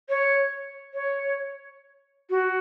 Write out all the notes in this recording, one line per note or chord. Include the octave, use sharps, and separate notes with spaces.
C#5
C#5
F#4